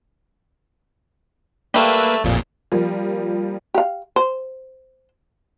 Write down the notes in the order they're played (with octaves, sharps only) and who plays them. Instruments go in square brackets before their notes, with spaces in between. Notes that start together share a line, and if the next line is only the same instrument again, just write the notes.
[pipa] G3 A3 [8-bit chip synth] A#3 B4 E6
[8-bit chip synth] A1 F2 A#2
[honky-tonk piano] F3 G3 A#3
[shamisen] G4 F5
C5